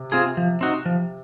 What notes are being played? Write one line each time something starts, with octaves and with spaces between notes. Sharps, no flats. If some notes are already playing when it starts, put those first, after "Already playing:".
Already playing: C3
C4 F4 G#4
F3
C4 D#4 F#4
F3